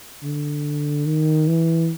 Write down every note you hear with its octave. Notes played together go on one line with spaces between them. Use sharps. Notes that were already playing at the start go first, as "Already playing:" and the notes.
D3
D#3
E3